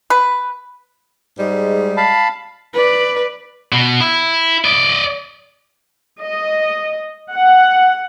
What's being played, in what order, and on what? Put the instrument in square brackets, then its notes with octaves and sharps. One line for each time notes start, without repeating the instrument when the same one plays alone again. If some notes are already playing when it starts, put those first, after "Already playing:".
[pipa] B4
[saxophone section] G#2 G3 G#3
[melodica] F5 A5 B5
[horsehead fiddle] B4 D5
[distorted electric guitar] B2
E4
D5 D#5
[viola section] D#5
F#5